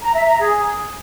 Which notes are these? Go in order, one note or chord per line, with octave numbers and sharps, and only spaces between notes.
A#5
E5
A#5
G#4